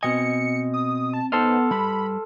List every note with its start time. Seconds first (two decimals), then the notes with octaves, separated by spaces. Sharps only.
0.03 B2 C4 D#5 G#5 C#7
0.73 D#6
1.13 A5
1.32 B3 D#4 A4 C5 D#5 C6 F6
1.71 G3 B4 B5